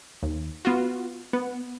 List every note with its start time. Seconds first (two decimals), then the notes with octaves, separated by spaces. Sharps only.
0.23 D#2
0.65 B3 F4 F#4
1.33 B3